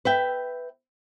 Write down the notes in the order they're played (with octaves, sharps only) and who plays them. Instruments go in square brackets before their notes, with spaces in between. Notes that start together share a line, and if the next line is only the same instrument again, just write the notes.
[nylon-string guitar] B4 E5 G5